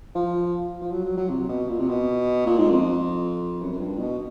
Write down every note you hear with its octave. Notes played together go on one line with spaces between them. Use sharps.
F3
F3
F#3
F#3
F#3
C3
B2
A#2
C3
B2
A#2
G#2
F2
F#2
F#2
G2
B2